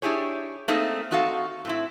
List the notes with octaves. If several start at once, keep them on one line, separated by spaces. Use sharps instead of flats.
D4 E4 G4 G#4 C#5
A3 A#3 C4 D#4 G#4
C4 D#4 F#4 A4 D#5 F5
A2 C4 E4